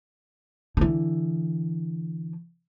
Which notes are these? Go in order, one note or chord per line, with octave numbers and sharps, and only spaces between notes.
D3 E3